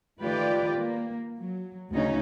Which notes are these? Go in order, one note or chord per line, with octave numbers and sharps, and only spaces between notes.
D#3 A3 F4 G4 B4 D5
A#3
F#3
D2 C#3 C#4 D#4